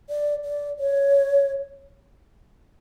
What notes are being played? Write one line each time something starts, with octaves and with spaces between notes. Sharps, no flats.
D5
D5
C#5